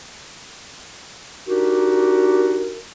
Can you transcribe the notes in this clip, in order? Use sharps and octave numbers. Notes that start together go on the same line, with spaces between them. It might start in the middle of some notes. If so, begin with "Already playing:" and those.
D4 D#4 F#4 G4 A#4